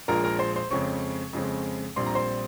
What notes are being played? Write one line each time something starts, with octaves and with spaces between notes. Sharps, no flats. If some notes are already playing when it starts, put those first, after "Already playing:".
A#1 A#2 F3 G#3 A#4 A#5
A#4 A#5
C5 C6
C5 C6
F2 C#3 G#3 C4 C#5 C#6
F2 C#3 G#3 C4
A#1 A#2 G3 C4 C6
A#5
C5 C6